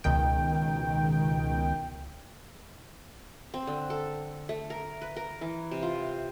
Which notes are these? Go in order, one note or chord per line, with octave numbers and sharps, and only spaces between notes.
C#2 B2 D#3 G5
C4
D3
A4
A3
A#4
B4
A#4
E3
C3
F4